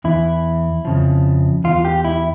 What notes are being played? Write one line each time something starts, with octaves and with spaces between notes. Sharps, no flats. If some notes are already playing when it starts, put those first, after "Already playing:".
E2 E3 E4
F2 C#3 F3
E2 E3 F4
G4
E4